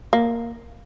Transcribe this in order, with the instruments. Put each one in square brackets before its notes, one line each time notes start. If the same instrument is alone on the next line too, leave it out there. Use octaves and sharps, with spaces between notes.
[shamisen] A#3